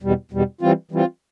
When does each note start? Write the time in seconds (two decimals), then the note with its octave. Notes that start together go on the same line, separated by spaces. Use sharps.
0.02 E2 B2 G3
0.31 E2 B2 G3
0.61 E3 G3 C4 F4
0.91 E3 G3 C4 F4